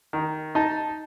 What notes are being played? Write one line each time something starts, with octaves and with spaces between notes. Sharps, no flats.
D#3
D#4 A5